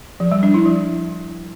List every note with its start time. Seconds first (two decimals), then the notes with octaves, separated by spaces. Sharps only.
0.20 F3
0.31 G3
0.43 D4
0.54 E4
0.66 F3